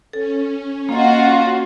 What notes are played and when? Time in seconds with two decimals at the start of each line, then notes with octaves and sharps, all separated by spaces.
0.13 C#4 A4
0.89 A#3 F4 F#4 D#5